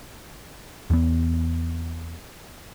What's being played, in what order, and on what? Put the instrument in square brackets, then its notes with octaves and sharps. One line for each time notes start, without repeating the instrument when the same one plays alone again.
[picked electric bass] E2 B3